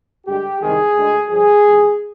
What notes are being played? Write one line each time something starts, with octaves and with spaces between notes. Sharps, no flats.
G2 D3 G#3 G4
C2 C3 D#3 G#3 G#4
D2 D3 G#3
G2 D3 F3 G#4
D#2 D3 G3